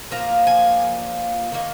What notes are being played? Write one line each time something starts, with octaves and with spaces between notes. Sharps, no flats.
A#2 F3 A#3 A#5
G#5
D#3 A#3 D#4